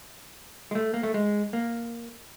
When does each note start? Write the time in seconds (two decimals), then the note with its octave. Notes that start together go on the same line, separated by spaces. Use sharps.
0.71 G#3
0.75 A3
0.94 A#3
1.03 A3
1.14 G#3
1.53 A#3